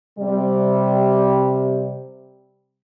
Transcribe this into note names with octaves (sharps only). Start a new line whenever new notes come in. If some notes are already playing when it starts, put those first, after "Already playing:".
C3 G3